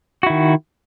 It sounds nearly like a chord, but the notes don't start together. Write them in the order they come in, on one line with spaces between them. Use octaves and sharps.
F#4 E4 D#3